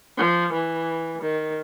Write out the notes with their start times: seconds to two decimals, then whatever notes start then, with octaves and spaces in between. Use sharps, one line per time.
0.18 F3
0.53 E3
1.22 D#3